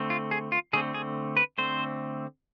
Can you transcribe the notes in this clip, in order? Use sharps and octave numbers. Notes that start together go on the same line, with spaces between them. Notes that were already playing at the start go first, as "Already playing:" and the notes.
Already playing: D3 A3 C4
F4
G#4
F4
D3 A3 C4 G#4
G#4
B4
D3 A3 C4 C5